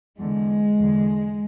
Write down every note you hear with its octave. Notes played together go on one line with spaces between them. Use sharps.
E2 D3 G#3
E2 D3